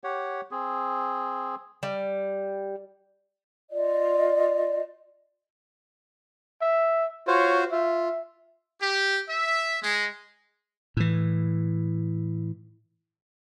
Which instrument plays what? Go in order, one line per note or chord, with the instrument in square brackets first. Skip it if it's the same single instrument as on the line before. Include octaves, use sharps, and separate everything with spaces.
[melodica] G4 C#5 F#5
C4 G#4
[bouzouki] G3
[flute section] F4 D5 D#5
[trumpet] E5
[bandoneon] F4 F#4 C5 [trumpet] C#5
[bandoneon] F4 [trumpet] E5
[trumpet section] G4
E5
G#3
[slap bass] A2 E3